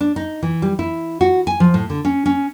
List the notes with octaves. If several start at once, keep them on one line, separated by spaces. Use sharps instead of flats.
D4
D#4
E3
G3
E4
F#4
G#5
F3
A2
D3
C#4
C#4